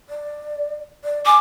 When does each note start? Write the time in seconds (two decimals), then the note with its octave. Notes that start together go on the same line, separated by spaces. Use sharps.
0.09 D5
1.04 D5
1.26 G#5 D6